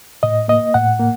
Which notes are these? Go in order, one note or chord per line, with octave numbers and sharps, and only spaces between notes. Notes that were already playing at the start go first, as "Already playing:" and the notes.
A2 D#5
A#3 D#5
A2 F#5
A#3